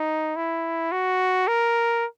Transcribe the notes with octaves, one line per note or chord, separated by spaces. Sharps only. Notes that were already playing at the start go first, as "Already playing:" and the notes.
Already playing: D#4
E4
F#4
A#4